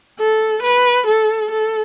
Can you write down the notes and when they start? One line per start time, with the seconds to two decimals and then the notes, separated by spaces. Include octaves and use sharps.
0.19 A4
0.63 B4
1.07 A4
1.51 A4